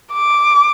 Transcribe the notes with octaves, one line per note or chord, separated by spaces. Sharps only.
D6